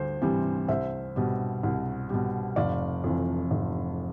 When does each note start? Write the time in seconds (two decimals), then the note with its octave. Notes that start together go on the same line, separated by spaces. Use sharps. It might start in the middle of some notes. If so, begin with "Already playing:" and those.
Already playing: D2 G3 C5
0.22 C3 E3 G3
0.68 C2 C5 E5
1.16 B2 G3
1.63 C2
2.09 B2 G3
2.56 F1 D5 F5
3.04 F2 E3
3.51 F1